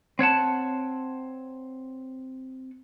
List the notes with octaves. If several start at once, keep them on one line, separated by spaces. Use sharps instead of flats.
C4 C#5 F#5 A5